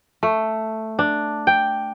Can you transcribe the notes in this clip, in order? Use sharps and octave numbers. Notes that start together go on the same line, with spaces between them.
A3
D4
G5